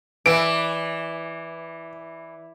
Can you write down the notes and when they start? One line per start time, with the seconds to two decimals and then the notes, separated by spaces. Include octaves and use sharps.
0.26 E3 B4 D5 E5 G#5 D7